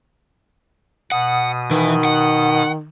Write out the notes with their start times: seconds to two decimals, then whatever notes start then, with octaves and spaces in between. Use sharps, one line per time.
1.12 B2 F#5 D#6
1.71 D#3 E3
2.05 F#5